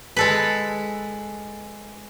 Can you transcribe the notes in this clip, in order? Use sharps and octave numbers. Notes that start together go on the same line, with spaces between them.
G#3 A4 B4